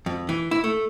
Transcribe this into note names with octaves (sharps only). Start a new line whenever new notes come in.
F2
E3
E4
A3